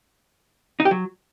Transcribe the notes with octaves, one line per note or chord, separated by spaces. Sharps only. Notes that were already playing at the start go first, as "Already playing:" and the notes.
D#4
G4
F#3